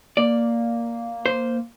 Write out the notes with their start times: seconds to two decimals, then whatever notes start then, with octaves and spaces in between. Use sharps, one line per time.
0.17 A#3 D5
1.26 C5